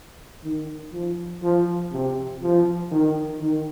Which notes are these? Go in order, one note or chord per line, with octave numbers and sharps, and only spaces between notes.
D#3
F3
F3
C3
F3
D#3
D#3